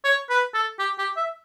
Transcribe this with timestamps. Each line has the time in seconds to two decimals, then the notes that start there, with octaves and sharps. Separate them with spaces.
0.04 C#5
0.30 B4
0.54 A4
0.79 G4
0.98 G4
1.17 E5